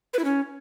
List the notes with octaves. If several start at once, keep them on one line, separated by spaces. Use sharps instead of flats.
B4
E4
C#4